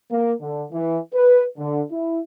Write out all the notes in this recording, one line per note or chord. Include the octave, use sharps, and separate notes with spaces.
A#3
D3
E3
B4
D3
E4